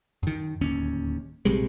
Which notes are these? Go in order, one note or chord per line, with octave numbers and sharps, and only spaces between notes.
F#2 D#3
D1 D#2 C#4
A#1 C3 G3 G#3